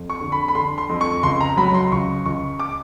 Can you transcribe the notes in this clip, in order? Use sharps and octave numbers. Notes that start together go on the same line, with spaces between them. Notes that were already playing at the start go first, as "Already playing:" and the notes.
Already playing: F2
C#6
D3
B5
B5
D3 C6
C6
F2
C#6
C#2 C6
A#5
F#3 B5
C6
C#2 C#6
C#2 C#6
D6